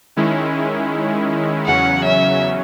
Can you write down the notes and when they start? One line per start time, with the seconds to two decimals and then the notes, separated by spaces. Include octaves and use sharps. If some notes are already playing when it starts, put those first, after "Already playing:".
0.16 D#3 G#3 C#4 E4
1.66 E2 C#3 F#3 C#4 F#5
2.04 E5